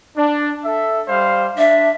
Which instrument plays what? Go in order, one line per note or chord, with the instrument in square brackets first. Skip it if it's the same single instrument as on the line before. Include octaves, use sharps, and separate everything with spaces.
[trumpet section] D4
A4 E5
G3 C5 F5
[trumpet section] D4 [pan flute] E5